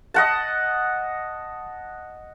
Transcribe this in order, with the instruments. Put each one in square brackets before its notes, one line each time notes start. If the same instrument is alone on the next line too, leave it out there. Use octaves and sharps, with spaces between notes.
[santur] D#5 F#5 A5